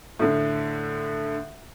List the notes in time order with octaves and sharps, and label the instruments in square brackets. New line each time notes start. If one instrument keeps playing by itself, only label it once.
[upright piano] A2 D3